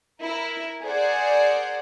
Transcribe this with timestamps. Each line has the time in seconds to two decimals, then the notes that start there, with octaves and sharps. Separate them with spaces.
0.21 E4 A#4
0.83 G#4 A#4 C5 D5 F#5